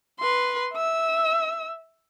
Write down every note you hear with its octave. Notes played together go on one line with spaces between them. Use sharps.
B4 C6
E5 E6